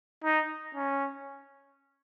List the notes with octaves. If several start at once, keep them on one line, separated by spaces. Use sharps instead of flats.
D#4
C#4